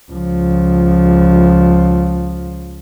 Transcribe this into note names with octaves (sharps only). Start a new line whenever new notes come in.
C#2 F3